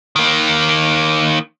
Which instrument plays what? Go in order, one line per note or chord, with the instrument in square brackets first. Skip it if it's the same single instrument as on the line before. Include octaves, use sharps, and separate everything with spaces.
[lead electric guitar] D#3 A#3